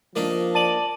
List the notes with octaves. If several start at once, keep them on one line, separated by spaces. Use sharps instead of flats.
F3 A#3 D4 D#4
D5 A5 D#7 F#7